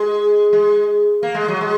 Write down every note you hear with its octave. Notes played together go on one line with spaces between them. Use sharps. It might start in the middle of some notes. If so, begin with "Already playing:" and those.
Already playing: G#3
G#3
A#3
G#3
F#3
G#3